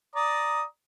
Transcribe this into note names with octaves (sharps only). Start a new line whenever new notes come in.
D5 A#5 D#6